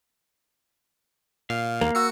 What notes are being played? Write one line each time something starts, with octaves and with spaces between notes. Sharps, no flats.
A#2 F5
D#2 A#3
F#4 E6 C#7